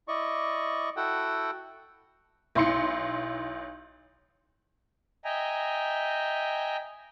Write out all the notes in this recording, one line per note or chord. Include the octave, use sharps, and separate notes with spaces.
E4 D5 D#5 C#6
E4 F#4 A4 F#5 G5
B1 E4 C6 C#7
D#5 E5 G5 G#5 A#5